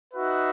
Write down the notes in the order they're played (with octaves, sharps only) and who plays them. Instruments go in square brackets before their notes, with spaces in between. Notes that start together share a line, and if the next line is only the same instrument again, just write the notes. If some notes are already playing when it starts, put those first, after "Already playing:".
[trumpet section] D#4 F#4 B4 E5